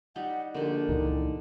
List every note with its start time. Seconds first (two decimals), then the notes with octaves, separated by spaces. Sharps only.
0.16 G3 D#4 F#5
0.54 A#1 D3 G4 A#4
0.89 C#2 A#2 D#3 E3